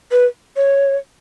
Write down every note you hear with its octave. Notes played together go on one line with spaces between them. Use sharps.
B4
C#5